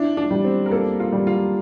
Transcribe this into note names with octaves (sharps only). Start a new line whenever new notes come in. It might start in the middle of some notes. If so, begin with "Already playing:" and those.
Already playing: D4 E4
D4
G3
C4
A#4
A#3 A4
F4
G3
F4